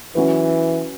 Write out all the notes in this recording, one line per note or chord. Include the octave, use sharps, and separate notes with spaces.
E3 F#3 C#4 F#4 B4